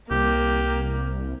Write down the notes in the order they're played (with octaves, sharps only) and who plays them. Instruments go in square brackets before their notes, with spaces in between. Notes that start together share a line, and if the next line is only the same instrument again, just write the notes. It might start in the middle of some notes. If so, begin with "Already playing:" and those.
[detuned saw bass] C2 [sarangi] A#3 [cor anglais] G4